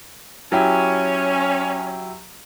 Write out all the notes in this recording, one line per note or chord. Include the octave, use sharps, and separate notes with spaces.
F#3 C#4 E4 G4